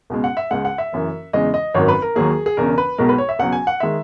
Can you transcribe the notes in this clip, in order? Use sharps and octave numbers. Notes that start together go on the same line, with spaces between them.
C#2 B2 G#3
F#5
E5
C#2 C#3 G#3 F#5
F#5
E5
F#1 F#2 E3
E2 C#3 E3 G#3 D#5
D#5
G#1 F#2 D#3 F#3 C#5
B4
A#4
D#2 D#3 F#3 A#3 G#4
G#4
E1 E2 C#3 A#4
B4
B1 B2 G#3 A#4
B4
C#5
E5
C#2 B2 F#3 F#5
G#5
F#5
D#3 G#3 E5